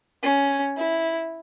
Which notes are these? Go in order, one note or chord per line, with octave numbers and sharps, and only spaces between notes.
C#4
E4